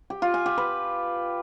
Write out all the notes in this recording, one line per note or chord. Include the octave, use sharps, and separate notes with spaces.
G4
F4
G#5
G4
B4